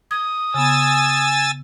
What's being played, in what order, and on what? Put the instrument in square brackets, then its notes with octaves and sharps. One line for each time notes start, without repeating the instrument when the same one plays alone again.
[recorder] D#6 [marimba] G#6
[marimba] C#3 B3 [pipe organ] G#5 E6 A6